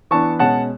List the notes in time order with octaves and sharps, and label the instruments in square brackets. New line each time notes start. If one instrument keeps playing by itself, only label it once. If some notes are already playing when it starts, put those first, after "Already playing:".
[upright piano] E3 B3 D4 A5 C#6
B2 G#3 C#4 F#5 A5